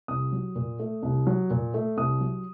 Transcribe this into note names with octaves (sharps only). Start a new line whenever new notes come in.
C2 D#6
F#3
A#2
A3
C2
F#3
A#2
A3
C2 D#6
F#3